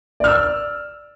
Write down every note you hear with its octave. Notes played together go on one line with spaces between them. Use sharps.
D5 E6 F6